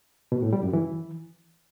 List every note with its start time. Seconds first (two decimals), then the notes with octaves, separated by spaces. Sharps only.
0.32 B2
0.42 A2
0.53 G3
0.63 F#2
0.73 E3